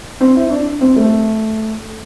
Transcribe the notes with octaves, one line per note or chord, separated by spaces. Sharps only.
C4
E4
D4
C4
A3